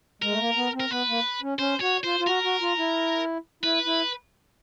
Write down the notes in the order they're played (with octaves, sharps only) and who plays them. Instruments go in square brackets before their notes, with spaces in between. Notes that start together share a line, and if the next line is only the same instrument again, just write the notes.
[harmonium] G#3 [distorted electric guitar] A#4
[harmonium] A3
A#3
B3
C4
[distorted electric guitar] A#4
[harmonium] B3 [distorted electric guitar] B4
[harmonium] A#3
C#4
[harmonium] C#4 [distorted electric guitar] C5
[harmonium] F#4 [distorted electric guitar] C#5
[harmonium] F4 [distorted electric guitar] C5
[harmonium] F4
[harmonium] F#4 [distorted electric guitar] A#4
[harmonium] F#4
F4
E4
[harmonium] E4 [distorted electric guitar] B4
[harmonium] E4